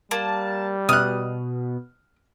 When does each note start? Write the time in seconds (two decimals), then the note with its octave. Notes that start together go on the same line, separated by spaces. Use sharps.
0.11 G3 A#3 A5
0.89 B2 D#6 F6 F#6